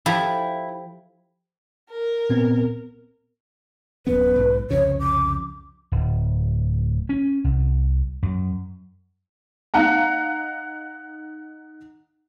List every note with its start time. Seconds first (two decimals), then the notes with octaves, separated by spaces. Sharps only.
0.06 F3 E4 G4 A4
1.90 A#4
2.30 A#2 B3 C4
4.07 D1 F#2 B3 B4
4.36 B1 G#2
4.71 C2 F2 C#3 C#5
5.00 D6
5.92 D1
7.09 C#4
7.44 C2
8.23 F#2
9.74 D#4 F5 F#5 A#5